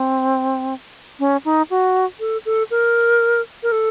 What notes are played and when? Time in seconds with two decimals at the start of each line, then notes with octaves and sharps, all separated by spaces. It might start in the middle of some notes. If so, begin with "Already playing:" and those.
Already playing: C4
1.19 C#4
1.45 D#4
1.70 F#4
2.20 A4
2.45 A4
2.71 A#4
3.63 A#4
3.72 A4